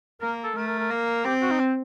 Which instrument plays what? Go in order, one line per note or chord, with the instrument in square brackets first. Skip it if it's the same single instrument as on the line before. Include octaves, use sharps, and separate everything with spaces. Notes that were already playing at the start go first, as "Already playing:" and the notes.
[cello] A#3 [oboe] A#4
[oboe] A4
[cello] A3 [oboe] A#4
[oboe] A#4
A#4
[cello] A#3
[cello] C4 [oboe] G4
[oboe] F#4
D#4
C4